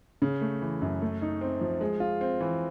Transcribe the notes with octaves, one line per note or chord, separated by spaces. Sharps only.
C#3
A3
E3
F#2
A3
D#4
C4
F3
G#3
F4
C4
E3